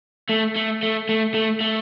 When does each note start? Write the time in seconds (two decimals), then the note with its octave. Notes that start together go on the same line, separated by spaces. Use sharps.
0.30 A3
0.56 A3
0.83 A3
1.09 A3
1.34 A3
1.61 A3